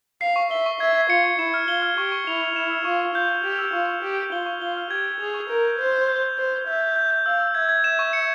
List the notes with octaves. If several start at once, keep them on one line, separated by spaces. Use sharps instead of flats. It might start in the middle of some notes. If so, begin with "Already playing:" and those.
F5 C7
C#6
E5 G7
C#6
E5 G#6
G#6
F4 C#7
C#6
E4 E7
F6
F4 G7
F6
G4 C#6
C#6
E4 F7
C#6
E4 E7
E6
F4 C#6
C#6
F4 G6
G6
G4 F7
E6
F4 C#6
C#6
G4 G6
G6
F4 G7
C#6
F4 G7
F6
G4 G#6
G#6
G#4 F7
C#6
A#4 G6
G6
C5 G6
G6
G6
G6
C5 G6
G6
E5 G6
G6
G6
G6
F5 E6
E6
E5 G#6
G#6
E5 E7
C#6
C#7